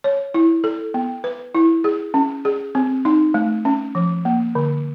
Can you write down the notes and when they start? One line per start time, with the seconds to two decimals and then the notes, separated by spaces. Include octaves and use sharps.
0.04 C#5
0.34 E4
0.64 A4
0.94 B3
1.24 B4
1.55 E4
1.84 G#4
2.14 C#4
2.45 G#4
2.75 C4
3.05 D#4
3.34 A3
3.65 C#4
3.95 F3
4.25 A#3
4.55 D3